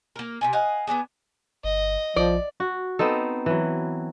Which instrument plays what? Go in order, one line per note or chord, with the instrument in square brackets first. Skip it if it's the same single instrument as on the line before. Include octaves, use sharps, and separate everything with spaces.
[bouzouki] A#3 A#4
C3 D#3 G#5
D#5 F5 F#5 G#5
B3 C4 D4 G#4
[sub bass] G1 [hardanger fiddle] D#5
[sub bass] A#1 [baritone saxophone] F3 [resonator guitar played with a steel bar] D5
[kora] F#4
B3 C4 D#4 A4
E3 F#3